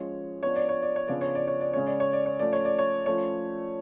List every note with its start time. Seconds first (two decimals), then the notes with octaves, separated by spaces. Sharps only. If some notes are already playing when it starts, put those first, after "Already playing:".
Already playing: F3 G#3 C#4 C#5
0.42 F3 B3 D4 C#5
0.56 D5
0.69 C#5
0.82 D5
0.96 C#5
1.08 C#3 F3 B3 D4 D5
1.21 C#5
1.35 D5
1.47 C#5
1.61 D5
1.73 C#3 G#3 C#4 C#5
1.87 D5
2.00 C#5
2.13 D5
2.26 C#5
2.39 F3 A3 C#4 D5
2.53 C#5
2.65 D5
2.78 C#5
3.06 F3 A3 C#4 C#5